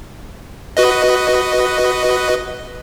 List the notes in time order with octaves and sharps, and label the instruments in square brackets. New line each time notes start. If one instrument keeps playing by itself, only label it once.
[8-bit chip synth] F#4 B4 D#5